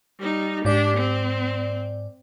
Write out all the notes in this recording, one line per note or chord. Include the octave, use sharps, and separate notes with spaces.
G3 D#4
G#2 D4 G4 D5
C4